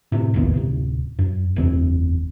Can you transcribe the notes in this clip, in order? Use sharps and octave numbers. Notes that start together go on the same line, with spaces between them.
A2 C3
F1 A#1 D#2 B3
D1 C3
F#2
F#1 E2 C4